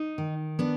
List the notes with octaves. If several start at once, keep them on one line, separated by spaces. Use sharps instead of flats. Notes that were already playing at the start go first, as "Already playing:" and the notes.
Already playing: D#4
D#3
B3 D4